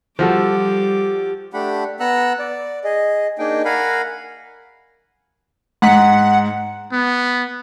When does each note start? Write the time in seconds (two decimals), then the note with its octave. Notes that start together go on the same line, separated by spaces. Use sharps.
0.19 F3 G3 F#4 G4 A4 D6
1.54 A3 D4 G4 F#5 B5
2.00 B3 F#5 A#5 E6 F#6
2.39 D5
2.84 G#4 D#5
3.39 A#3 D4 D#4 G#4 G5
3.65 A#4 F5 F#5 G#5 B5
5.82 G#2 F#5 B6
6.92 B3